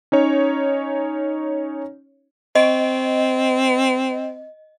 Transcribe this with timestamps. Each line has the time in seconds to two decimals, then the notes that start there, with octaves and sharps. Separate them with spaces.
0.12 C#4 D#4 C#5
2.55 C4 D#5